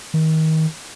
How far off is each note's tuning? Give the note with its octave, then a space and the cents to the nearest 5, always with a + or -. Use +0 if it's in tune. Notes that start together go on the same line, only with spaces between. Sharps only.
D#3 +30